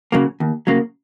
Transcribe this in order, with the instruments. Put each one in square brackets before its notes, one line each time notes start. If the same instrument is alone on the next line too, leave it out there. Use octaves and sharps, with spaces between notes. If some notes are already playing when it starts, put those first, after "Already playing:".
[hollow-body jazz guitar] C#3 F#3 A#3
D#2
C#3 F#3 A#3